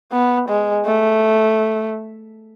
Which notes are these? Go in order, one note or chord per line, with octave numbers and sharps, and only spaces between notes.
B3
G#3
A3